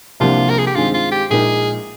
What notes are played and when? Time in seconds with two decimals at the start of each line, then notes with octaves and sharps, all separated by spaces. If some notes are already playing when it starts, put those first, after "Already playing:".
0.20 C2 C3 F3 A#3 D4 F4
0.50 A#4
0.58 G#4
0.67 G4
0.75 G2 D#3 G#3 C4 F4
0.94 F4
1.11 G4
1.30 A#1 A#2 G#3 D#4 G#4 A#4